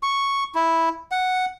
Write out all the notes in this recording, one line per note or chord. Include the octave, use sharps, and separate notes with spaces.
C#6
E4
F#5